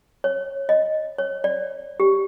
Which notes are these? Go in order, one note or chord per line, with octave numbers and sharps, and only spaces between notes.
C#5
D#5
C#5
D5
G4